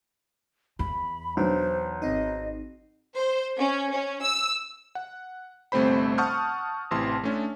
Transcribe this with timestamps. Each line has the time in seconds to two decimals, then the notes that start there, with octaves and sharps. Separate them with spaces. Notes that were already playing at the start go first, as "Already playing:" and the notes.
0.79 E2 B5
1.37 B1 D4 C5
2.02 G#1 C4 D#4 D#5
3.15 C5
3.58 C#4
3.92 C#4
4.22 E6
4.95 F#5
5.72 G1 C3 A3 C4 C5 B5
6.18 F#5 A5 C#6 D#6 F6 G6
6.91 A1 C3 E3 A5 C6
7.24 A3 C#4 D4